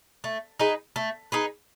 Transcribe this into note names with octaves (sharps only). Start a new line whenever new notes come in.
A3
D#4 G#4 B4
A3
D#4 G#4 B4